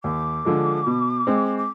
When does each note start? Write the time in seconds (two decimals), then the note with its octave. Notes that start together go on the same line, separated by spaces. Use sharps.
0.04 D#2 D6
0.45 D3 F3 G#3
0.86 B2
1.27 G#3 C4
1.57 D6